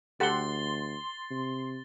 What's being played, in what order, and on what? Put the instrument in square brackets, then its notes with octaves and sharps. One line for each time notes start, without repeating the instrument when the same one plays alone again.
[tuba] D2 [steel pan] G4 A4 F#5 [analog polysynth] C6 [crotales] A6 G7
[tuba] C3